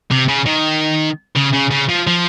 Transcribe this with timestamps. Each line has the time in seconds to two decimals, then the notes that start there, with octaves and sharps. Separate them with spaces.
0.11 C3
0.28 C#3
0.46 D#3
1.36 C#3
1.54 C#3
1.71 C#3
1.89 F3
2.07 F3